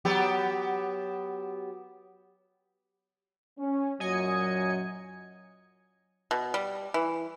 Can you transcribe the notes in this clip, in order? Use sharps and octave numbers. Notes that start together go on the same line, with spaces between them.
F#3 B3 G4
C#4
F#2 A#2 F#3 D#5 G#5 C#7
B2
G3
E3